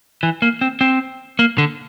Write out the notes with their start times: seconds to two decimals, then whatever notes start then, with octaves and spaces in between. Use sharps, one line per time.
0.23 E3
0.42 A#3
0.61 C4
0.81 C4
1.39 A#3
1.58 D3